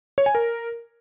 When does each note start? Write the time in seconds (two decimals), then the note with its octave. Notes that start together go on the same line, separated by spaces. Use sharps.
0.18 C#5
0.26 G#5
0.35 A#4